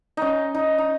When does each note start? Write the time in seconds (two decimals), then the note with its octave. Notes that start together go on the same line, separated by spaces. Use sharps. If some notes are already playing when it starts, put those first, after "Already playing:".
0.17 C#4 D#4
0.55 D#4
0.78 D#4